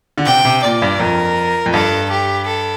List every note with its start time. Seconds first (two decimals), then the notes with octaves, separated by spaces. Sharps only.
0.18 D3
0.26 C3 G5
0.45 C3
0.63 A#2 D5
0.82 G2
0.99 F2 A#4
1.66 F2
1.73 G2 A4
2.10 G4
2.47 A4